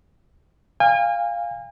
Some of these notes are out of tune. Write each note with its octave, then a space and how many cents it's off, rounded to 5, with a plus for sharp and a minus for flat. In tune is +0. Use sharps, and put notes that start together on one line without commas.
F5 +0 G#5 -40